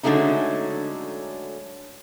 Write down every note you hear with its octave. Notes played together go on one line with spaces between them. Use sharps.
D3 F#3 G#3 A3 C#4 D#4